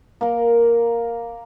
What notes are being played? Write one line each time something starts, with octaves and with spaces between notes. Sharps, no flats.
A#3 A#4